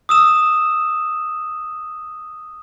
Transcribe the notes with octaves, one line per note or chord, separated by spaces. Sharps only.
D#6 E6 E7